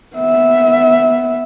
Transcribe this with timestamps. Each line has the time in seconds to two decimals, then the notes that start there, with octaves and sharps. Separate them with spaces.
0.16 B3 E5